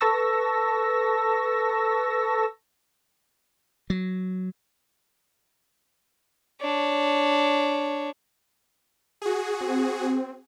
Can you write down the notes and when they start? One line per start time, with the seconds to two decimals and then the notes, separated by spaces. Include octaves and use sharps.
0.01 A4 B4 A5 C#6 E6 A#6
3.90 F#3
6.61 D4 C#5
9.22 F#4 G#4
9.61 C4